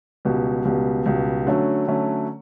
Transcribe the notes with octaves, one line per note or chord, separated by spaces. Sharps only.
C#2 B2 G3
C#2 B2 G3
C#2 B2 G3
D3 F#3 A3 C#4
D3 F#3 A3 C#4